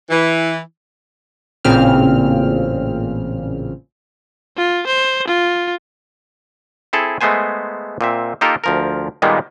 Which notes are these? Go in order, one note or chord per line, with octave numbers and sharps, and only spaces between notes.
E3
A1 A#2 C#3 C4 F6
F4
C5
F4
C4 E4 G#4 A4
G#3 A3 B3 C5 G#5
A#2 C4 E5
A#3 D#4 F4 G4 A4 A#4
D2 F3 A#4
A#2 D#3 G3 G#3 A#3 B3